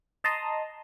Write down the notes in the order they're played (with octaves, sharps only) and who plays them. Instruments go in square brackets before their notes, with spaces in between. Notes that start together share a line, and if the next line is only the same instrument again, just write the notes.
[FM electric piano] D#5 A5 A#5 C6 D#6